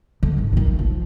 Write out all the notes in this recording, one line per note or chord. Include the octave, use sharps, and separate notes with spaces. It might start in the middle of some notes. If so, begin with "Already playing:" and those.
D3
G#2
D#3 D#4
A#1
F3